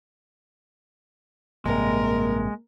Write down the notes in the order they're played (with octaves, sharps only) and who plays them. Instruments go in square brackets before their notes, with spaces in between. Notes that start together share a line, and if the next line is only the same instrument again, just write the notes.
[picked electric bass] A1 G2 C3 [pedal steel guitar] G#3 [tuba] A#3 [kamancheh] A#4